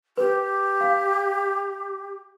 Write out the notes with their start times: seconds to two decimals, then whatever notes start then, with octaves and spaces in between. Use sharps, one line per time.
0.17 G4 B4
0.81 F5